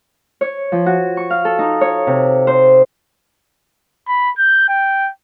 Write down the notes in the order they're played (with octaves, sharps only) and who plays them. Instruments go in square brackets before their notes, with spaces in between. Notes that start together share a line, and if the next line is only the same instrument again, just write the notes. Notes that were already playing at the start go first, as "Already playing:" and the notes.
[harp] C#5
F3
F#4
C#6
F5
A4
D#4
C#5
C3
C5
[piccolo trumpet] B5
G6
G5